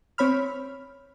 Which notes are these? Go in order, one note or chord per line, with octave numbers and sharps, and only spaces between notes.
C4 C#5 B5 F6